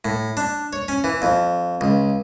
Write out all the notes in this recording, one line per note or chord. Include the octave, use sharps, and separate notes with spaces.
A2
D4
C#5
C#4
E3
F2
C#2